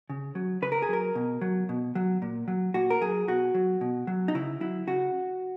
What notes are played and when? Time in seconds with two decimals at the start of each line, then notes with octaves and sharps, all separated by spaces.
0.10 C#3
0.35 F#3
0.62 C#3 B4
0.72 A#4
0.82 G#4
0.89 F#3 A#4
1.15 B2
1.41 F#3
1.69 B2
1.95 F#3
2.22 A#2
2.48 F#3
2.74 A#2 F#4
2.90 A#4
3.01 F#3 G#4
3.28 B2 F#4
3.55 F#3
3.81 B2
4.07 F#3
4.28 D#4
4.35 C#3 E4
4.60 F#3 E4
4.87 C#3 F#4